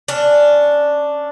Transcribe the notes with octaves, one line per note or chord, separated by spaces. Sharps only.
C#4 D4